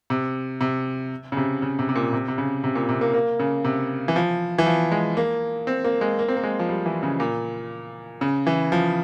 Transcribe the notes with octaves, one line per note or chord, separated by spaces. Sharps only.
C3
C3
C#3
C3
C#3
C3
C3
A#2
C3
C3
C#3
C3
A#2
C3
A#3
A#3
C#3
C3
E3
F3
E3
F3
G#3
A#3
C4
A#3
G#3
A#3
C4
A#3
G#3
F3
G3
E3
C#3
A#2
C#3
E3
F3